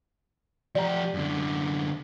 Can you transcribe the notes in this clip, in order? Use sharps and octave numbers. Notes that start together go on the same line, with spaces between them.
F3 G4 D5 A#5
F#2 D3